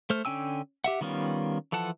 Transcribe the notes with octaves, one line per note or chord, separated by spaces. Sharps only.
A3 C5 F6
D3 C#4 G5 G#5 E6
G4 E5 F#5
D#3 G3 B3 C#4 F4
E3 F3 A4 F#5 A5